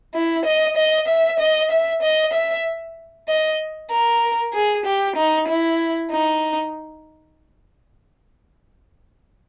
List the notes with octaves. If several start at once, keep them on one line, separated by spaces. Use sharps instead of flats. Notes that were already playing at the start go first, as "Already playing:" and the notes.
E4
D#5
D#5
E5
D#5
E5
D#5
E5
D#5
A#4
G#4
G4
D#4
E4
D#4